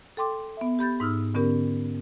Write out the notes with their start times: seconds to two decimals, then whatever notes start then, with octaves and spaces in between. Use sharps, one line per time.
0.17 A4 G5 C6 D6
0.57 B3 E5
0.79 G4 B5 G6 A6
1.00 G#2 D#4 E6 F6
1.34 D3 B3 C#4 G4 A#4